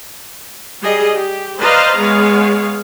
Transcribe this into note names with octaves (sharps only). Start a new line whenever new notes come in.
G3 G#4 D#5
G4
B4 C5 D5 D#5 F5 A#5
G#3 B3 G#4 C#5 F5